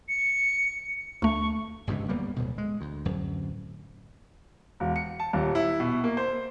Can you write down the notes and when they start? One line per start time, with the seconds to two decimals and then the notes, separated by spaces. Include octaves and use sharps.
0.09 C#7
1.22 D2 A3 C#6
1.87 G1 C#2 G2 C3
2.08 D1 G3 A#3 B3
2.36 D1 D2 B2
2.58 G#3
2.81 D2
3.05 D1 F#2
4.80 E1
4.96 C#7
5.20 A5
5.33 D#1
5.55 E4
5.80 B2
6.04 A#3
6.17 C5